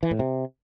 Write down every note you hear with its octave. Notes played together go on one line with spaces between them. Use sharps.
E3
A2
C3